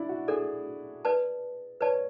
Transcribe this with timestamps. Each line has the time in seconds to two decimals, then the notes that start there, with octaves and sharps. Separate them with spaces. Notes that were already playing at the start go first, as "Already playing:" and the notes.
Already playing: D4 E4
0.09 F#4
0.28 D4 G#4 A4 D5
1.05 B4 D5 A5
1.81 B4 C#5 D5 A5